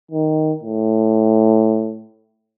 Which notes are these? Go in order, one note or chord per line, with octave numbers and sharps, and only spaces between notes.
D#3
A2